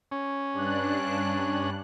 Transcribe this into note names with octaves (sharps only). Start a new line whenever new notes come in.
C#4
G2 D4 F#6